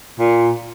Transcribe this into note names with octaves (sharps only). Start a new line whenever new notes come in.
A#2